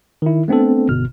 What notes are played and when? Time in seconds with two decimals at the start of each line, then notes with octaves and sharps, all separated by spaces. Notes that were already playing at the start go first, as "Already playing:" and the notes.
0.22 D#3 E4
0.48 A3 B3 C4 D4 A4
0.89 G1 B2 F6